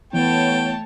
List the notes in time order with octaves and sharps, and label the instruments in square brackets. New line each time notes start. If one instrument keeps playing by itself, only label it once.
[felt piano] E3 [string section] A3 C#5 A5 [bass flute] B3 [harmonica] G5